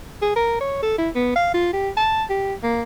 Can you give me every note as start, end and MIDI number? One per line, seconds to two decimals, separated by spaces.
0.22 0.33 68
0.36 0.56 70
0.61 0.82 73
0.82 0.97 69
0.98 1.09 64
1.15 1.34 59
1.36 1.50 77
1.54 1.71 65
1.73 1.89 67
1.97 2.24 81
2.30 2.54 67
2.63 2.83 58